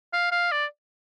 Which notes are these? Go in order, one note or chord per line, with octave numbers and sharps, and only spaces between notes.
F5
F5
D5